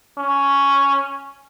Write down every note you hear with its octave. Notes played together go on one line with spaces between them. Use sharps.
C#4